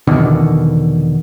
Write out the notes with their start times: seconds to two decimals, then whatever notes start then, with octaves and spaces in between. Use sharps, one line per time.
0.07 E2 B2 D3 D#3